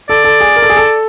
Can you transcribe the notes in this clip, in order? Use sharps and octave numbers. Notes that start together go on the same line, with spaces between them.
A4 D5
A4
G#4
A#4
A4
G#4
A4